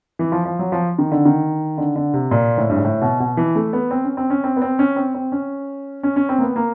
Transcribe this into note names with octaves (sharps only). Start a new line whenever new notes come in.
E3
F3
F3
F#3
F3
D#3
D3
D#3
D3
D3
C3
A#2
A2
G2
G#2
A2
B2
B2
E3
A3
B3
C4
C#4
C4
C#4
C4
B3
C4
C#4
C4
C4
C#4
C#4
C#4
C4
A#3
B3
A#3